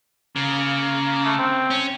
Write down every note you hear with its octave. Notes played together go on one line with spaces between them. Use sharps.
C#3 A#3
A3
C4
C#4